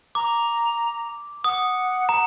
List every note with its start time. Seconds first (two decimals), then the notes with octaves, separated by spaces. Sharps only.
0.15 A#5 D6
1.44 F#5 D#6
2.09 A#5